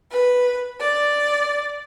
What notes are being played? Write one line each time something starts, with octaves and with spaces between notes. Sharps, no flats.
B4
D5